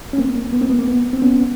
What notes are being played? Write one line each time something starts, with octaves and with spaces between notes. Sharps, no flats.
C#4
A#3 C4
A#3
B3
A#3 C4
B3
A#3
B3
C4
B3 C#4